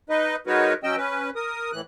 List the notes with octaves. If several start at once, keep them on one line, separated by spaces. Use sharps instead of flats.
D#4 B4 D#5
G#3 D#4 F#4 A#4 B4 C#5
F#3 C#4 D#5 G5 E6
C#4 B4
A#4 D#6
A2 E3 F#6